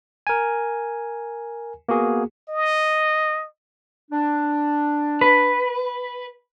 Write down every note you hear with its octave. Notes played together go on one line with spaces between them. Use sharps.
A#4 G#5
A#3 B3 F#4 G#4
D#5
D4
B4